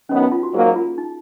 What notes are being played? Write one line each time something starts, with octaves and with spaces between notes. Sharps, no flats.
F#2 D#3 F#3 B3 C#4
D#4
F4
F#4
G#2 F#3 A#3 G#4
F4
D#4